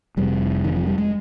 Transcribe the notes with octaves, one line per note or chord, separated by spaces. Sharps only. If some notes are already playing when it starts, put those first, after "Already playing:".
F1 F2 C3 G3
D#3
F3
G3
G#3